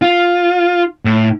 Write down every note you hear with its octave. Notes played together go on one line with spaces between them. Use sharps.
F4
A2